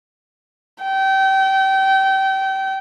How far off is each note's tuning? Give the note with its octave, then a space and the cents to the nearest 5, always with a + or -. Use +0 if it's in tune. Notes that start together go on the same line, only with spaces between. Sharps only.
G5 -30